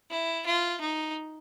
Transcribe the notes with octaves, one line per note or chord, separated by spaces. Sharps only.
E4
F4
D#4